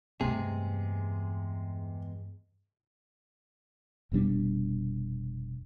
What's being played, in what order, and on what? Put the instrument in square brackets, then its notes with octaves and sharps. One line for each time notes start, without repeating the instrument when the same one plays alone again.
[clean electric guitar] E2 G#3 G#4 [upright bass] G2 A3 [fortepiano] C3
[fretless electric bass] F1 B2 G3 D4